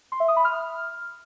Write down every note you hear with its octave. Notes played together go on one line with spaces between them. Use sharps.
C6
E5
D#6
B5
F6